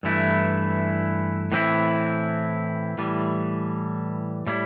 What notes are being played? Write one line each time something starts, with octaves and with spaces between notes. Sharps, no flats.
G2 E3 A3 E4
A2 E3 C4 E4
A2 E3 G3
A2 G3 E4